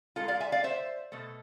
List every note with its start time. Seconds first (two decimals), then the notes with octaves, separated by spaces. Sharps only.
0.16 G#2 G#3 F4 A4
0.28 D5 F5
0.40 E5 G#5
0.52 D5 F5
0.64 C5 E5
1.12 B2 A3